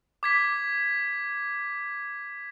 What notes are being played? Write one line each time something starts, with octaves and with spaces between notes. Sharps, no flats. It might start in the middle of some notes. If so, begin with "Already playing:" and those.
D6 G#6 B6